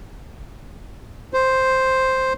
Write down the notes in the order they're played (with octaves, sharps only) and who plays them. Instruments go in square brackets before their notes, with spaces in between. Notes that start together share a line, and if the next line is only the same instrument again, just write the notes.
[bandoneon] C5